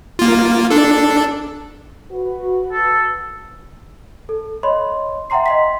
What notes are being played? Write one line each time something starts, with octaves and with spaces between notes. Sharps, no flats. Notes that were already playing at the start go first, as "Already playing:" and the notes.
A#3 F4
D4 A4
F#4 B4
A4
A4
C#5 D#5 B5 C6
E5 F#5 G5 A#5 C6 C7
D#5 C6 B6